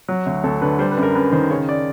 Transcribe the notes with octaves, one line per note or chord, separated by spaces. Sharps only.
F#3
D2
D2 A4
D3 B4
G3 C5
B4
F#2
A#4
F#2 B4
D#3 C5
C#3 C#5
D5